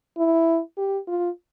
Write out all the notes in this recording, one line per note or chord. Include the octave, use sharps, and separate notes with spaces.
E4
G4
F4